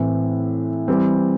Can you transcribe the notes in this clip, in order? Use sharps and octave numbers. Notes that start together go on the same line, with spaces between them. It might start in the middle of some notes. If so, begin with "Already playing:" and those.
Already playing: A2 E3 C4
E3 G3 C4